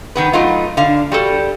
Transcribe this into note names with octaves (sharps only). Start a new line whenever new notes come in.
D#3 B3 B4
F#3 A3 B3 D#4 F4
D3 F5
G3 F#4 A4